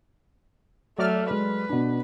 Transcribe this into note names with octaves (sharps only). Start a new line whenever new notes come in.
F#3 A3 D5 F6
G#3 B4
B2 D4